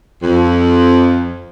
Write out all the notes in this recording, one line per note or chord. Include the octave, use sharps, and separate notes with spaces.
F2